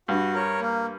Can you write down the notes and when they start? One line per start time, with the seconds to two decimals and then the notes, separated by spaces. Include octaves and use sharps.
0.08 G2 F#4
0.34 A#4 C#5
0.60 A#3